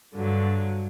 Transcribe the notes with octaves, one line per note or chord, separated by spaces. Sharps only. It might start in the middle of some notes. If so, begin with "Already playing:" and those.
G2 D3 F#3